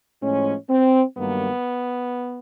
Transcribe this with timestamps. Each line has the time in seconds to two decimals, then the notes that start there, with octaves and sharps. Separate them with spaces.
0.22 A2 F3 G#3 C#4
0.70 C4
1.17 G2 D#3 F#3 A#3 B3